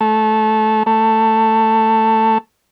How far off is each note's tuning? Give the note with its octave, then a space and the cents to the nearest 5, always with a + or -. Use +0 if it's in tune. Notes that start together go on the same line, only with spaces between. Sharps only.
A3 -20
A3 +10